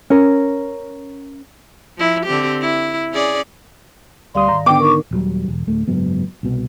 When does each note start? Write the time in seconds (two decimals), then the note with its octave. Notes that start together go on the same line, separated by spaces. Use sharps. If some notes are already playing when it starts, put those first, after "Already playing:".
0.10 C#4 A#4
1.97 F3 E4
2.26 D3 C4 G4
2.61 E4
3.12 C#4 G#4 D5
4.35 D2 G3 D5 F5 C6 D#6
4.48 G#2 D#3 A#5
4.66 D3 B3 G5 D6
4.80 D#4 A#4 C#6
5.11 D#1 F#3 G3
5.48 E1
5.67 D1 A3
5.87 F#1 G#2 F#3 B3
6.43 C2 B2